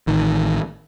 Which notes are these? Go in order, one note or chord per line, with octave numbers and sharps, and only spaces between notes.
A1 D#3